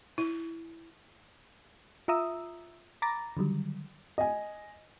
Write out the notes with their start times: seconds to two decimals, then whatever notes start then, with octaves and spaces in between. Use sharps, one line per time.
0.18 E4
2.08 F4 E5 A#5 D#6 E6
3.02 A#5 B5 D6 A6 A#6
3.37 D3 D#3 F#3 G3
4.18 D#5 G#5